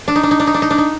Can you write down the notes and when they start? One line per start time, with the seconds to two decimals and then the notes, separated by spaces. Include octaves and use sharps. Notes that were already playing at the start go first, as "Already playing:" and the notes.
0.08 D4
0.16 D#4
0.23 D4
0.31 D#4
0.40 D4
0.47 D#4
0.54 D4
0.62 D#4
0.70 D4
0.78 D#4